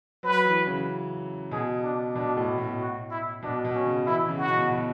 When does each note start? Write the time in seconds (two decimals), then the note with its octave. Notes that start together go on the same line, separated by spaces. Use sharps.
0.23 F#3 B4
0.45 E3
0.67 C#3
1.51 B2 G#4
1.83 D4
2.15 B2 D4
2.37 A2
2.58 B2
2.80 F#4
3.11 E4
3.42 B2 D4
3.65 B2
3.75 C#4
3.86 C#3
4.06 E3 E4
4.28 C#3
4.38 F#4
4.50 B2
4.70 B2